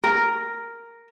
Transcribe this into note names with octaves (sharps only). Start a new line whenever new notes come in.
A#4